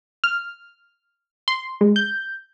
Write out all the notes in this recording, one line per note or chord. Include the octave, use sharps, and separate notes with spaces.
F6
C6
G#3
G6